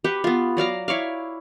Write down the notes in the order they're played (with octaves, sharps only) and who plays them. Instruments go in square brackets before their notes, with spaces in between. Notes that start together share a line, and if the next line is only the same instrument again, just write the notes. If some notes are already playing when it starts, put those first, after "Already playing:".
[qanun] G4 B4 F#5
B3 F4
F#3 D5 F5 A#5
E4 C#5 D5 F5